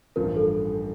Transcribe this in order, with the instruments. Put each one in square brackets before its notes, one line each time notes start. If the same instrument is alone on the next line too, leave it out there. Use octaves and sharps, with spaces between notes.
[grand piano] A1 G2 F3 [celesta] A#4
[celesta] A4